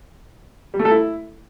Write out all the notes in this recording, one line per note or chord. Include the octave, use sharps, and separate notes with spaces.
G3
A3
A4
E4